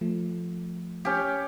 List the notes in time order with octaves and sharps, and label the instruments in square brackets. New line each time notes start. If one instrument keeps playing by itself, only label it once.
[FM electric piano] F3 A3
[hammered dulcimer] C#4 G4